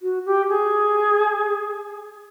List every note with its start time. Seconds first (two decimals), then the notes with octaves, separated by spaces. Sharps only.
0.02 F#4
0.25 G4
0.49 G#4